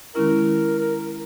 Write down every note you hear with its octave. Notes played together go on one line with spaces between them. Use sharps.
D#3 G#3 C#4 E4 A#4
A#4